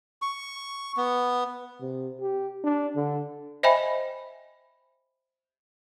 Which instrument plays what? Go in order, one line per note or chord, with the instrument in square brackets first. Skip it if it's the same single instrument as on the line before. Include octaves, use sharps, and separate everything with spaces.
[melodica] C#6
B3
[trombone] C3
G4
D4
D3
[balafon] C5 D#5 E5 G5 G#5 B5